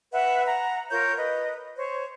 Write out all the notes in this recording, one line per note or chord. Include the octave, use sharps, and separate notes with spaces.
B4 E5 F#5
F#5 A#5
F4 A#4 C#5 G6
B4 D#5
C5 C#5